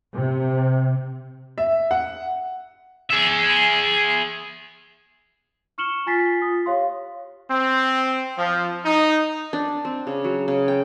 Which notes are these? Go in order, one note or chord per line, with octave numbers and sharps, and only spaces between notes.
C3
E5
F#5
G#4 E5
C#6 F6 C#7 E7 F#7 G7
F4 G#5 A6 B6 C7
F4 D#6
G4 C#5 F5 C6
C4
F3
D#4
D4
C4
C#3
F#3
C#3
G5